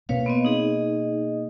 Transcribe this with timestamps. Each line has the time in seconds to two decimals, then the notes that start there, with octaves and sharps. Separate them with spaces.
0.09 B2 A#3 B4 C#5 F5
0.26 B3 C4 D#5
0.45 D#4 G#4 D#5